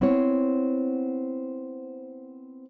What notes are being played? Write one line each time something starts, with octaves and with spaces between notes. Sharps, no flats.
B3 C4 E4 C5 C#5